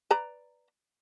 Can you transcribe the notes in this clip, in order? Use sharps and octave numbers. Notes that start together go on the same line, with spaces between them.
B4 D5 A#5